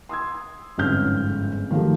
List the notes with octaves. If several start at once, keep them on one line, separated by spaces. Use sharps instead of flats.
C6 D#6 E6 G#6
G1 F2 G#2 C#4 F6 G6
D#3 F3 F#3 A3 G4